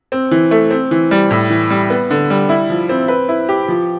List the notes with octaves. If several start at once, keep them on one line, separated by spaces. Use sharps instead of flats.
C4
E3
A3
C4
E3
G3
A2
E3
G3
B3
D3
G3
E4
F3
C4
B4
E4
G4
F3